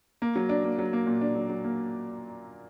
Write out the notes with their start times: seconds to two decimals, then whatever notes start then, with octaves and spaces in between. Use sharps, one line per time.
0.22 A#3
0.36 F#3
0.49 D4
0.64 A#3
0.79 F#3
0.93 A#3
1.06 A#2
1.21 D4
1.35 F#3
1.49 F#3
1.64 A#3